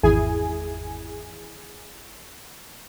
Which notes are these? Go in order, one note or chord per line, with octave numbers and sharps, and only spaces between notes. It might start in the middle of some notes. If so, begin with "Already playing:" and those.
G#1 E2 E4 G#4 G#5